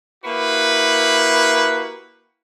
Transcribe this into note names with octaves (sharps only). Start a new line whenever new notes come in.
A#3 E4 F#4 G4 B4